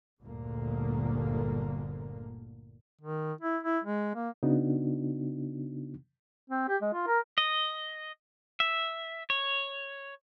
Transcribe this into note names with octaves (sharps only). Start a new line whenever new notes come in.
G1 D2 A#2 D3 A#3
D#3
E4
E4
G#3
A#3
C#3 B3 D4 D#4 F#4
C4
G4
G#3
F4
A#4
D#5
E5
C#5